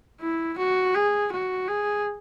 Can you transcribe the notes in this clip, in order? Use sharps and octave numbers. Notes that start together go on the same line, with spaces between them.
E4
F#4
G#4
F#4
G#4